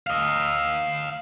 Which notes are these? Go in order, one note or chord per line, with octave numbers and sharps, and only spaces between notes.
D#5 F5